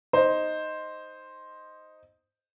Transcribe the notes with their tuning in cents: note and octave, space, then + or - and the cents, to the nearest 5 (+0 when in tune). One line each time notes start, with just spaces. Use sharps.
D#4 +0 C5 +0